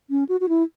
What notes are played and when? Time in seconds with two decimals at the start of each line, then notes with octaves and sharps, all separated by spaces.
0.10 C#4
0.29 F#4
0.41 F#4
0.49 E4